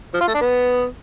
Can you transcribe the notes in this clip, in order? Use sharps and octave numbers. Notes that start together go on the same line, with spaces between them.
F3
F4
A3
D4
B3